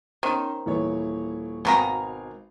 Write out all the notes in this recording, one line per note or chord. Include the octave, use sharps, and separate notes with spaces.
D#3 C#4 D#4 C5
D#1 E3 C#5
G#1 B2 D#3 F5 G#5 A#5